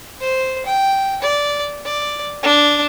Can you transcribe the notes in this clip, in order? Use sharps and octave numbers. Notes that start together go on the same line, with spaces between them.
C5
G5
D5
D5
D4